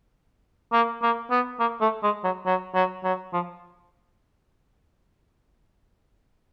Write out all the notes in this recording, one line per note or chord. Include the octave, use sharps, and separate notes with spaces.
A#3
A#3
B3
A#3
A3
G#3
F#3
F#3
F#3
F#3
F3